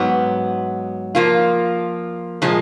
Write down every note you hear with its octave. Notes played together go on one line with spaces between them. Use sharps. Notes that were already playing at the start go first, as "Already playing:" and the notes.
Already playing: G#2 F#3 B3
F3 A#3 F4
A#2 F3 G#3